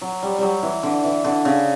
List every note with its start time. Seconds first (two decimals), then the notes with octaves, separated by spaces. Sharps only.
0.02 F#3
0.23 G3
0.38 F#3 G3
0.63 E3
0.83 D3
1.04 E3
1.25 D3
1.45 C#3